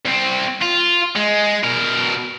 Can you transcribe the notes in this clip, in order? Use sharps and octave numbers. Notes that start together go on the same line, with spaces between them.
C2 C4
F4
G#3
B2 A#4